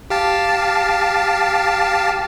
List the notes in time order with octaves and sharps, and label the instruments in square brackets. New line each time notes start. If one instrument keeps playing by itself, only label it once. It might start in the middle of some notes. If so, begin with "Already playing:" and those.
[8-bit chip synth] G4 F5 A5